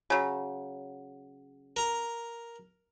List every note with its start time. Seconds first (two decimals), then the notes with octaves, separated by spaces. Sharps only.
0.10 C#3 F#3
1.76 A#4 A#5